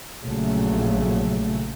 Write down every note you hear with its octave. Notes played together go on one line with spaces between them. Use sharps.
A#1 C#3 F#3 A3